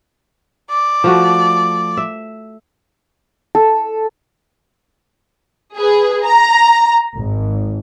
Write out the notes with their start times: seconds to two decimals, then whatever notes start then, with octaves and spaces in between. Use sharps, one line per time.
0.70 D5
1.04 F3 A3 F#4
1.97 E5
3.55 A4
5.77 G#4 B4
6.24 A#5
7.16 G#1